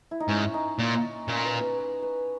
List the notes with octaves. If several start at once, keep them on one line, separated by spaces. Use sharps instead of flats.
E4
D#4
G#2 C#4
D#4
A#2
A#2 C#4
B4
B4
B4
B4